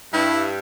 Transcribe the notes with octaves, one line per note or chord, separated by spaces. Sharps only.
G2 E4